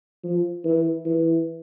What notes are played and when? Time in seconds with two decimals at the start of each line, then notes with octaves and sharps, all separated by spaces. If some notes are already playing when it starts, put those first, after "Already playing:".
0.24 F3
0.65 E3
1.05 E3